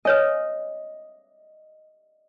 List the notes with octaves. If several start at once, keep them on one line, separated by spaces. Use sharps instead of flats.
B4 C#5 D#5 G#5